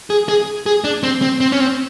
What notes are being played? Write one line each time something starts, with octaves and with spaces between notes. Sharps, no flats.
G#4
G#4
G#4
D4
C4
C4
C4
C#4
C4